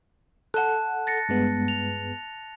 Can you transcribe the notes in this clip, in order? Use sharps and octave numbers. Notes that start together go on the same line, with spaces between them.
A4 F#5 A5 F#6
A6 A#6 C#7
G2 G#3 B3
F7